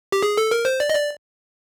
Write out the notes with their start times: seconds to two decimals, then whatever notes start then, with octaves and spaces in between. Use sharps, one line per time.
0.12 G4
0.23 G#4
0.37 A4
0.51 A#4
0.65 C5
0.80 D5
0.90 D#5
0.95 D5